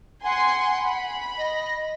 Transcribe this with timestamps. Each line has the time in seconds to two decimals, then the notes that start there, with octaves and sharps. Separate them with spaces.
0.24 F#5 G#5 C6
0.80 B5
1.38 D#5